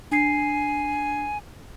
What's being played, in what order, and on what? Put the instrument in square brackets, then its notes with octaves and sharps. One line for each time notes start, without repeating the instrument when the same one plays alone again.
[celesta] D4 C7 [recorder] G#5